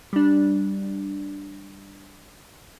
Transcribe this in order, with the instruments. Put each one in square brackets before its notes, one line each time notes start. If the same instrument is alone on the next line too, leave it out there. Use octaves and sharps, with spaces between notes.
[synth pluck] G3 D4